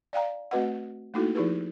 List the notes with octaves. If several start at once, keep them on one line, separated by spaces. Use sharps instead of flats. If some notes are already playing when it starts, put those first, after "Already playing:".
D5 F5 G5 A#5
A3 C4 F#4 B4 D#5 F#5
A3 A#3 D#4 E4 F#4 A4
F3 D#4 E4 G4 G#4 B4